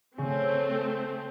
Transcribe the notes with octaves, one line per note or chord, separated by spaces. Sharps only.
C#3 A3 C4